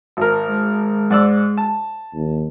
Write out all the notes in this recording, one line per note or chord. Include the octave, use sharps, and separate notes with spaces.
G#1 A#4
G#3
G#2 D5 E6
A5
D#2